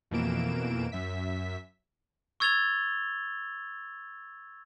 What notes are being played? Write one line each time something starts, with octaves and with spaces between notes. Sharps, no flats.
F2 B2 E3 A#3 D7 E7
F#2 E5 B6
C#6 E6 G#6 A6 F7 G7